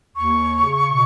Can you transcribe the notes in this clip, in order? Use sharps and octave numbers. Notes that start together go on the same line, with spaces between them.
D#2 C#6
C#3
B2